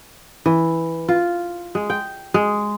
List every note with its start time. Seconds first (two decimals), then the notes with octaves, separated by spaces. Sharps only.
0.46 E3
1.08 F4
1.75 G#3
1.90 G5
2.34 G#3